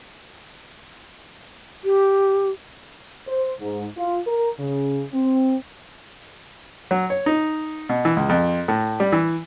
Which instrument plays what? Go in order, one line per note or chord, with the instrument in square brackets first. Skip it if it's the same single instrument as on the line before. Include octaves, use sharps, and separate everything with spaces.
[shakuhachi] G4
[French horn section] C5
G#2
F4
A#4
C#3
C4
[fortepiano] F#3
C#5
D#4
B2
E3
C#2
F2
A2
G3
E3